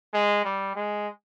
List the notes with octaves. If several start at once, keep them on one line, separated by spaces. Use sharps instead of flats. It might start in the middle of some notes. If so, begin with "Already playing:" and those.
G#3
G3
G#3